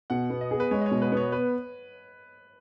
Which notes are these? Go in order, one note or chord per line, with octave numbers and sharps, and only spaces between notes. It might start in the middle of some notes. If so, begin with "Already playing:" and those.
B2 F#5
B3
D#5
G#4
B4
G#3 C#5
D#5
C#5
B2
B4
B3 C#5
B4